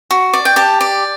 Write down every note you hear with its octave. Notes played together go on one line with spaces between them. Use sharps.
F#4
D5
G5
G4 A5
D5